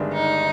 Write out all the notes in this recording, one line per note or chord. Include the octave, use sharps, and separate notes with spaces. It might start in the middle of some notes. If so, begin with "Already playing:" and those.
Already playing: G1 G2 D#3 G#3 D4
D#4